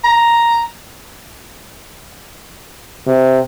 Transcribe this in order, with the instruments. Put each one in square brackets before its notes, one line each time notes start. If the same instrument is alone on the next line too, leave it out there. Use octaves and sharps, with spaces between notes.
[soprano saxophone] A#5
[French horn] C3